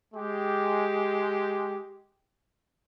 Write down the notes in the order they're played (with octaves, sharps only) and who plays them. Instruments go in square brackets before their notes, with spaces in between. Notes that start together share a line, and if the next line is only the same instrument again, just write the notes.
[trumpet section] G#3 G4